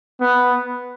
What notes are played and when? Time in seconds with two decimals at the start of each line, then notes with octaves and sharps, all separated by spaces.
0.21 B3